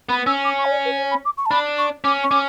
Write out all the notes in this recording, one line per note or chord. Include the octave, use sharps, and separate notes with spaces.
B3 B5
C#4 E6
D6
C#6
C#5
D5
B4
C#5
B5
D6
C#6
A5
D4 B5
C#6
C#4 D6
C#6
C#4 D6